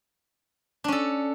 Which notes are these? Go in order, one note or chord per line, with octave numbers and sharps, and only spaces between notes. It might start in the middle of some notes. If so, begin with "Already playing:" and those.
C#4 D4 A4